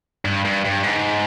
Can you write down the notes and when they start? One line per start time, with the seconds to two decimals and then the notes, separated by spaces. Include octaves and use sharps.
0.25 G2
0.45 G2
0.65 G2
0.83 G#2